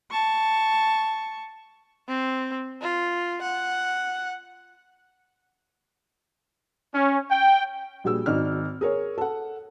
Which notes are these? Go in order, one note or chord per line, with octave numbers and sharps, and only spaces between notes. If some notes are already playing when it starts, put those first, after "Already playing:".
A5 C#6
C4
F4
F#5
C#4
G5
A#1 G3 F#4 G#4 E6
G#1 D#4 F#4 D5 F6
G#4 A#4 C#5
A4 F#5